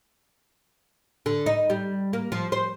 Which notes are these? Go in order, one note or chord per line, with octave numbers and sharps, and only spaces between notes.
D3
D#4
G3
A#3
F3
C5